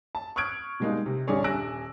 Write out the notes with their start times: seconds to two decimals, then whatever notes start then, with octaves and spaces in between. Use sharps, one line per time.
0.15 A5
0.36 C#6 D#6 F6 F#6 G#6 D7
0.80 B2 G3 G#3 A#3 D#4
1.06 C3
1.27 D#1 G2 D3 G#4 C#5 D5
1.44 D#1 G#5 E6 F#6 A#6 D7